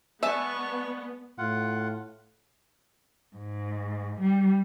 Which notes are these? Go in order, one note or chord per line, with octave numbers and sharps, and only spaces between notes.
G#3 B3 D5 E5 G#5 A5 C#6
A2 F4 F#5
G#2
G3